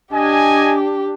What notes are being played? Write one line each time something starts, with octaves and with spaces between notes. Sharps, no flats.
D4 G4 D#5 G#5